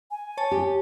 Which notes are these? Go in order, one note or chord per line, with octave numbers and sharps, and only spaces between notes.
G#5
C#5 A5
G4